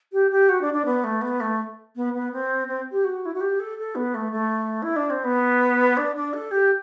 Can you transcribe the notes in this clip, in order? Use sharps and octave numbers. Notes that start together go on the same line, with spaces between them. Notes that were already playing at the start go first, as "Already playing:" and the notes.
G4
G4
F#4
D4
D4
B3
A3
B3
A3
B3
B3
C4
C4
G4
F#4
E4
F#4
G4
A4
A4
B3
A3
A3
E4
D4
C4
B3
D4
D4
A4
G4